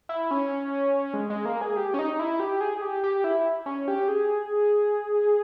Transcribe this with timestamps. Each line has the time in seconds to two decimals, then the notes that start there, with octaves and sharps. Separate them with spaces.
0.09 E4
0.31 C#4
1.14 G#3
1.30 G#3
1.45 A#3
1.62 G#4
1.77 G4
1.94 C#4
1.99 D#4
2.19 E4
2.40 G4
2.61 G#4
2.82 G4
3.04 G4
3.24 E4
3.66 C#4
3.88 G4
4.08 G#4